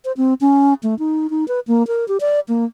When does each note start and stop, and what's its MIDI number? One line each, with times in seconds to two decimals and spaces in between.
0.05 0.12 72
0.17 0.34 60
0.41 0.74 61
0.83 0.97 57
0.99 1.30 63
1.30 1.47 63
1.48 1.60 71
1.67 1.86 58
1.87 2.07 70
2.08 2.17 67
2.20 2.40 74
2.48 2.65 58